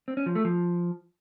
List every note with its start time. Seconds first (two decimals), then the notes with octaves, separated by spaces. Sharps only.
0.08 C4
0.17 C#4
0.26 F3
0.35 A3
0.45 F3